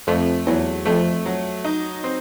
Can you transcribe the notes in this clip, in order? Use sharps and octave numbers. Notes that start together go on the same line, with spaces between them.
F2 A3
E2 F#3
F2 A3
F#3
D#4
C4